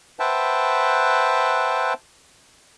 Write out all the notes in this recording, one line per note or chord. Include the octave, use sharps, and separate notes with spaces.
B4 C5 E5 F#5 G5 A5